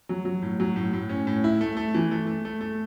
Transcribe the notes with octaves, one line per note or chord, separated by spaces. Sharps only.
F#3
F#3
A2
F#3
A2
A2
C#4
A2
E4
A3
A3
E3
A3
A3
A3
A3